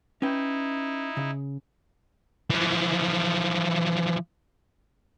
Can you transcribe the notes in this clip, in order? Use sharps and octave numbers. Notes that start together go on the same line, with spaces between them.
C#4 D#4 E4 B4 G5
C#3
E3 F3